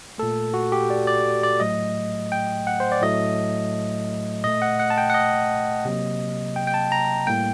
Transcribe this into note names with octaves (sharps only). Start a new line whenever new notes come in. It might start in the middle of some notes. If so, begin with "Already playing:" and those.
A#2 A3 A4
F#4
G4
D5
D5
D5
A2 F#3 A3 D#5
G5
F#5
C5
D5
A2 F#3 A3 D#5
A#2 A3 D#5
F#5
F#5
A5
G5
F#5
D#5
C3 F#3 A#3
G5
G5
A5
A#5
A2 G3 A#3 G5